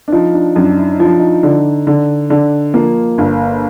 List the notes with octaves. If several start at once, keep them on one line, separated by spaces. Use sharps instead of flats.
D4
F3 D#4
D4
F#2 D4
E4
D#4
F3
D4
D#4
D3
D3
D3
F3 A#3
G1